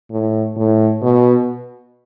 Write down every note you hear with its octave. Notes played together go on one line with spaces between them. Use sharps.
A2
A2
B2